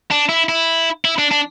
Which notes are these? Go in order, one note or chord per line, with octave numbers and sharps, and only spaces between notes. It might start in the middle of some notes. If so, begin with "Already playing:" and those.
D4
E4
E4
E4
D4
D4